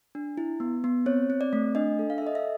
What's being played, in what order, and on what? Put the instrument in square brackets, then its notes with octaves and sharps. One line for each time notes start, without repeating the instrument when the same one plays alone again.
[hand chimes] D4
E4
B3
B3
C4 C#5
C4
D5
A3
D4 D#5
A4
F5
E5
A4 D#5
E5